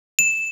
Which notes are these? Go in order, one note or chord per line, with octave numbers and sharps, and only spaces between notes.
E7